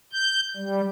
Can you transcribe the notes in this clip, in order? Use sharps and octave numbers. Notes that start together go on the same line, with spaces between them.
G6
G3